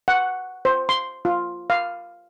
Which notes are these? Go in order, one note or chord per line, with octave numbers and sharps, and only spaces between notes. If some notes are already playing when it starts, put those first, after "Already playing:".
F#5
C5
C6
F4
F5